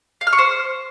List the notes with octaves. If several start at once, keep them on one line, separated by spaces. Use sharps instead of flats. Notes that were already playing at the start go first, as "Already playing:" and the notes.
F5
F6
C#6
C5